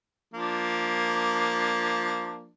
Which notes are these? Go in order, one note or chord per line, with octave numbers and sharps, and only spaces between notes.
F3 A#3 D4